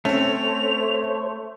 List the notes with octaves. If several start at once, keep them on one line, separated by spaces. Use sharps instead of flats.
A3 C4 C#4 A4 C5 C#5 F7